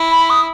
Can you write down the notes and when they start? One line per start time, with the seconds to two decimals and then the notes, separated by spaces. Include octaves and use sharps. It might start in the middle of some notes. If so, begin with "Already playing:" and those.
Already playing: E4
0.12 B5
0.30 D#6